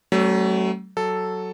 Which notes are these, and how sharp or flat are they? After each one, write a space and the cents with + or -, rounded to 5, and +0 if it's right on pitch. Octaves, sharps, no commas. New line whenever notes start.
F#3 +40 A3 +0 C#4 -35
F#3 +10 A4 +0